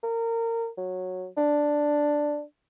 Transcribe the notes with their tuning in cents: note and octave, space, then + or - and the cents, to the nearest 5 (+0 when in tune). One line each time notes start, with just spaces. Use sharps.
A#4 -25
F#3 -10
D4 +5